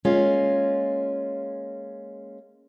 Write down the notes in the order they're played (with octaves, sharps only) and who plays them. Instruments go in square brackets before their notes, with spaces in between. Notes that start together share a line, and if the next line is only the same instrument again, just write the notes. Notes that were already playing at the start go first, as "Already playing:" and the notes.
[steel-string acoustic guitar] G#3 A#3 C#4 F4